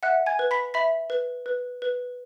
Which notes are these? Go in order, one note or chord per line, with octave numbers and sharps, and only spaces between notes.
E5 F#5 F#6
G#5 G#6
B4
B5 B6
E5 B5 B6
B4
B4
B4